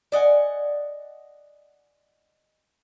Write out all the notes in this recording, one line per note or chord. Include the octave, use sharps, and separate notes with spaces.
D5 D#5 F#5 G#5